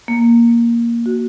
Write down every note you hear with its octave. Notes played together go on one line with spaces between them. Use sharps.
A#3
F#4